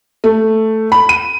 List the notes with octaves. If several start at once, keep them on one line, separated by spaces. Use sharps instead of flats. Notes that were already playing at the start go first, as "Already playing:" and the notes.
A3
B5
D#7